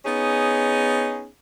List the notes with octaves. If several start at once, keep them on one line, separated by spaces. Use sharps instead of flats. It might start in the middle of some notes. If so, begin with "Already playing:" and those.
B3 C#4 D#4 G#4